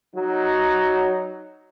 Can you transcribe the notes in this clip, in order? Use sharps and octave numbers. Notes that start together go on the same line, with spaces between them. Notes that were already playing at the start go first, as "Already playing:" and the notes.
F#3 D#4